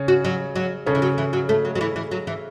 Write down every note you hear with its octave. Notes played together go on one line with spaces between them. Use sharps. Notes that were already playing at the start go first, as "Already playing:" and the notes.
Already playing: C#3 C#4
F#4
F#3
F#3
C#3 A3 C#4
E3
F#3
E3
F#3
A3
F#3
F#3
E3
E3
F#3
E3